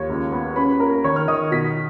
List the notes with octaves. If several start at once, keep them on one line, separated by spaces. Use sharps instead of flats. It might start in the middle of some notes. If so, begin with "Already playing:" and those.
Already playing: D#2 C#5 C#6
C#2
B3
C#4 B4 B5
A#3 A#4 A#5
D#3 C#5 C#6
F6
D#3 D#5 D#6
B2 B6